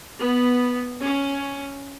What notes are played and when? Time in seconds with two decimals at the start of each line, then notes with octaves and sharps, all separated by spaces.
0.18 B3
1.02 C#4